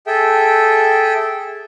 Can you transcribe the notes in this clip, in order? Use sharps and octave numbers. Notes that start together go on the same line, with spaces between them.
G#4 A4 E5 G5